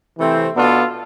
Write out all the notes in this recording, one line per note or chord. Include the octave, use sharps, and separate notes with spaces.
C3 E3 A3 C4
B2 B3 D4 F4 A4